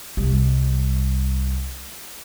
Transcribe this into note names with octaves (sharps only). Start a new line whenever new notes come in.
C2 G3